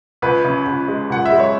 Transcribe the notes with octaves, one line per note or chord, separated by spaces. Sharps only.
C#2 B4
C#3
C#2
G#3
C#2 F#5
E5
G#3
C#5